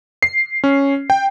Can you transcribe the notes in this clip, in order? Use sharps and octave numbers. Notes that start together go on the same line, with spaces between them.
C7
C#4
G5